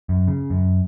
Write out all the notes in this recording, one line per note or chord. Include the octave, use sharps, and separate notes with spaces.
F#2
C#3
F#2